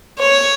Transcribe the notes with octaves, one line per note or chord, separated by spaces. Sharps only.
C#5